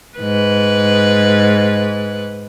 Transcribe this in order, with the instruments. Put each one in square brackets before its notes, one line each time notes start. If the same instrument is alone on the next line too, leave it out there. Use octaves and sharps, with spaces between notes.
[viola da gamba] G#2 B4